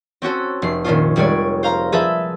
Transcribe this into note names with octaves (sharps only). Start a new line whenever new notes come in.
C4 C#4 F#4 A4
F1 C7
A#2 D#3 A#3 C#4 D4 F4
F1 G3 G#3 C#5 D5 G#6
C5 F5 A#5
F3 G#4 A4 B4 E5